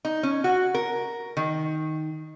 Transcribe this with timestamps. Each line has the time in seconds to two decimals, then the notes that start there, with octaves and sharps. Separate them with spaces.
0.05 D#4
0.23 C#4
0.44 F#4
0.75 A#4
1.37 D#3